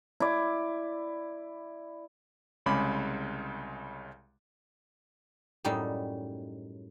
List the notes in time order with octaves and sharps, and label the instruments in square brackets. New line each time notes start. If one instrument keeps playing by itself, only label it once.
[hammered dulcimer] E4 D5
[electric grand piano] C2 C#3 G#3 B5 D6
[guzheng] F#2 A2 G3 D#4